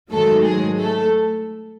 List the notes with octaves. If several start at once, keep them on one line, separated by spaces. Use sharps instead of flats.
G#2 D#3 F#3 A3 A4
G#3 G#4
A3 A4